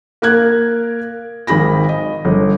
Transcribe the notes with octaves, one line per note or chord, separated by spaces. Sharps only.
A#3 A#4 F#6 G#6
G#1 D#3 G#4 B5 A#6
D#5
G1